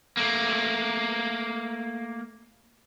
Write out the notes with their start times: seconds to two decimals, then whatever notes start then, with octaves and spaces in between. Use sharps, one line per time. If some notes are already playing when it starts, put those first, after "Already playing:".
0.17 A3 A#3